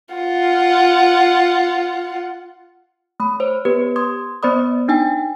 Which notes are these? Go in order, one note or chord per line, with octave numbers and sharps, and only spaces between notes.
F4 F#5
A3 B5
C5 C#5
B3 G4 B4
C6 D#6 G#6
B3 C5 D5 B5 D#6
D4 D#4 G5 G#5